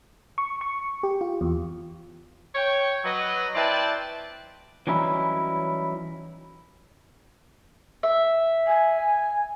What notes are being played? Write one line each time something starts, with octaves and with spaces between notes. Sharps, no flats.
C#6
C#6
G4
F4
E2
C#5 G5
F#3 B4 D#5
C4 E4 B4 D5 G5 A5
E3 F#3 G3 C#4 D#4 E4
E5
G#5